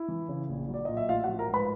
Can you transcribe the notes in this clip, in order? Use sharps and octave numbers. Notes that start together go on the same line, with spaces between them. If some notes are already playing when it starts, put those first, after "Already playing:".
Already playing: E4
E3
C#3
A#1
F#3
D5
A#2 D#5
E5
A1 F4 F5
F#4 F#5
F3
A#4 A#5
G#2
B4 B5